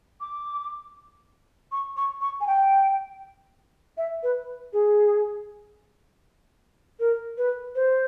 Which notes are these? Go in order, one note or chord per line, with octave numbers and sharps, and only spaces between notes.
D6
C#6
C#6
C#6
G#5
G5
E5
B4
G#4
A#4
B4
C5